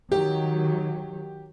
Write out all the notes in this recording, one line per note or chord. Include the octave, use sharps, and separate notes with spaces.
D#3 F#3 G4